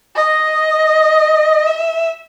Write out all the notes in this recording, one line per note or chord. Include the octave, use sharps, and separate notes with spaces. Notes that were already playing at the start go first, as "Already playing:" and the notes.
D#5
E5